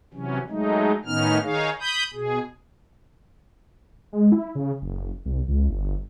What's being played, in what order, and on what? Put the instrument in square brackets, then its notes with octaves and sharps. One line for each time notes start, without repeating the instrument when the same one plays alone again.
[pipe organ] C3 E3 F#3 C#4
F#3 G#3 A3 D#4
A2 D#3 B3 C#4 D#4 F6
D#3 D#4 G#4 C#5 F5
B5 D#6 G6
B2 G#4
[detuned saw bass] G#3
E4
C#3
F#1
C2
C#2
G1